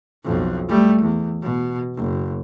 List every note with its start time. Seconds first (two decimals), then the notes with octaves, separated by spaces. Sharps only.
0.24 B1 F2
0.68 G3 A3
1.01 E2
1.42 B2
1.96 F#1